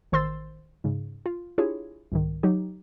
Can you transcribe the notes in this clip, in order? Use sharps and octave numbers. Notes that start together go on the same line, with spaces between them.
A1 D#3 C5 C6 E6 A6
G#2 C#3
F4
D4 E4 F4 G4 G#4 C#5
C2 G#2 D#3
F#3 D#4 G4